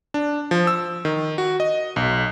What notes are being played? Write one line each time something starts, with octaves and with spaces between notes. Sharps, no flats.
D4
F3
E6
D#3
F#4
D#5
B1